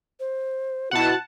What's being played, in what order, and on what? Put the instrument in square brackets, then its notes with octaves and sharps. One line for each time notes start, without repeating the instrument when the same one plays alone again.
[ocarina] C5
[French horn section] B2 E4 [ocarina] F#4 [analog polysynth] F#5 A5